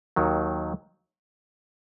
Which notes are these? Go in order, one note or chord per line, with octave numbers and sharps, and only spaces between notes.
D#2 D#3 F#3